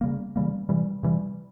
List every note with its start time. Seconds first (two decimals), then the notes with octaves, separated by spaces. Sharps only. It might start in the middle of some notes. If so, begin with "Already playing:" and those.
0.01 C#3 E3 G3 A#3
0.36 C#3 E3 G3 A#3
0.69 C3 E3 G3
1.03 C3 E3 G3